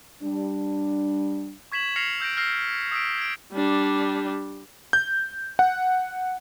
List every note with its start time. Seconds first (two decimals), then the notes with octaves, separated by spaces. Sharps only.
0.23 G3 D4
1.72 C#6 G#6 B6 E7 F#7
1.96 F6 A#6 C7 C#7 F7
2.20 E6 G6 A#6 D7
2.37 E6 F6 A#6 C7
2.91 D#6 E6 B6 D7
3.18 G#6 D7
3.53 G3 D4
4.93 G6
5.59 F#5